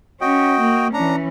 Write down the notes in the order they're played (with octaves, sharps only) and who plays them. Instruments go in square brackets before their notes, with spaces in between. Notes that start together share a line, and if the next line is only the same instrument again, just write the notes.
[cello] C#4 [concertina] F#4 D#5 G5
[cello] A#3
[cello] E3 C#4 [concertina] D4 A#5